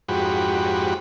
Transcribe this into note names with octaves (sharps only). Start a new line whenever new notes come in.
F2 G#2 F#4 G4 B5